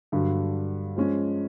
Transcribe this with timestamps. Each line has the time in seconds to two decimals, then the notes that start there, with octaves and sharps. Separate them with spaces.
0.12 G2 D3 F#3
0.96 F3 G#3 C#4